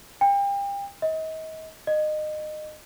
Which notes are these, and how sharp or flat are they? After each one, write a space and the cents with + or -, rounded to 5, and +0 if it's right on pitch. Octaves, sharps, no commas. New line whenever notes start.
G5 +35
D#5 +35
D#5 -25